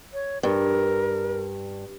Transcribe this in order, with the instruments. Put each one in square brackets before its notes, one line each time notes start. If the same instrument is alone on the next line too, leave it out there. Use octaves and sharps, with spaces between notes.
[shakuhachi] C#5
[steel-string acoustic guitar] G2 [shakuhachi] A#4